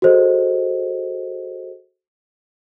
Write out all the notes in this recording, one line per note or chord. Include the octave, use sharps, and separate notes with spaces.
F#4 G#4 A4 C5 D#5